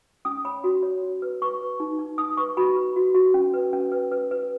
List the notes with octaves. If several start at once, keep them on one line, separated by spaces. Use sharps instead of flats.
C#4 D#6
C#5 B5
F#4
C#5
F#4
B4
B4 C#6
B4
D#4
D#4
D#4 D#6
B4 C#6
F#4 B5
B4
F#4
F#4
C#4
B4
C#4
B4
B4
B4